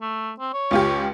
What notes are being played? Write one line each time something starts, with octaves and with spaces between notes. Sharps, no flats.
A3
C4
C#5
C#2 F4 G4